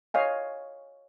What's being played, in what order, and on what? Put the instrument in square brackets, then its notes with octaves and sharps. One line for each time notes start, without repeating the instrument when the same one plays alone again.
[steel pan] C#5 D#5 F5 G#5